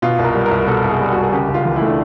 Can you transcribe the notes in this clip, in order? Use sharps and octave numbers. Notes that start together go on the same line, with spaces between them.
B2 F4
C2
A#4
G3
A#4
C2
B2 A4
C2
G#4
G3
F#4
C2
G#4
C#3 G4
C#2
F4
E3
A3 E4
D4